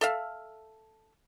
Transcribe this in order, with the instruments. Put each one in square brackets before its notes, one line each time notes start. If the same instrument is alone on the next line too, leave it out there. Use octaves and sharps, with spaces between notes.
[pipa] A4 E5 F5